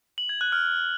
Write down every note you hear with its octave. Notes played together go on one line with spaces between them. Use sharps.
F#7
G#6
F#6
F6